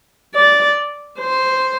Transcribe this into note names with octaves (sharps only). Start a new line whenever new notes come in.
D5
C5